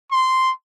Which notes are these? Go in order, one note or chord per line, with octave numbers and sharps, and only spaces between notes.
C6